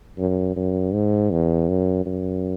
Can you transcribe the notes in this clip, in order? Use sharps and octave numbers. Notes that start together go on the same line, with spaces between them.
F#2
F#2
G#2
E2
F#2
F#2